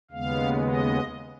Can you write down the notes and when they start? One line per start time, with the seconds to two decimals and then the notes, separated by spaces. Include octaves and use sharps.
0.11 D#2 C#3 G#3 B3 F5
0.66 D#5